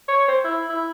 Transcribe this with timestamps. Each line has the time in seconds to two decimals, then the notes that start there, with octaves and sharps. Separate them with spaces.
0.08 C#5
0.28 C5
0.44 E4
0.69 E4